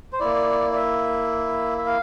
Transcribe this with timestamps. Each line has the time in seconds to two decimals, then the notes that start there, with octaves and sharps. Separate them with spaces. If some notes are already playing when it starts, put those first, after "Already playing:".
0.13 C5
0.20 A#3 E4 D5
0.71 D5
0.75 E5
1.78 E5
1.86 F5